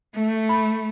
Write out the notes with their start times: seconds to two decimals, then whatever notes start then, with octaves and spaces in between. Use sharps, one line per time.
0.15 A3
0.49 B5